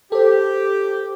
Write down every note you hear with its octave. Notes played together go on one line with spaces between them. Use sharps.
G4 A4 C5